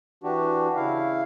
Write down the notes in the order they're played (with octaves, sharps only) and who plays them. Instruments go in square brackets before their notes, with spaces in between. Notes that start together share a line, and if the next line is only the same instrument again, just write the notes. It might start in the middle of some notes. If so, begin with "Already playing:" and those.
[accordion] E3 D4 F#4 G4
C#3 E4 F5